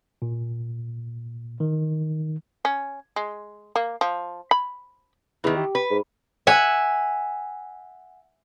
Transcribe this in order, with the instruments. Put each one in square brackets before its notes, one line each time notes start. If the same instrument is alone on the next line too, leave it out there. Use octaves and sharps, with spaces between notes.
[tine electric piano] A#2
D#3
[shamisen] C#4
G#3
A#3
F3
B5
[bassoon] E2 [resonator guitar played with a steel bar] D#3 E3
[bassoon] G4
[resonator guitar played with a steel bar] B4
[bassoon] G#2
[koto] E5 F#5 G#5